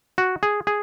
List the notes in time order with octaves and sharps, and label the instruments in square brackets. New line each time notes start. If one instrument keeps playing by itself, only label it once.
[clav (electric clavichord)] F#4
G#4
G#4